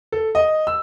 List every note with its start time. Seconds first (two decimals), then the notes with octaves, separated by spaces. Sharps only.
0.12 A4
0.35 D#5
0.67 E6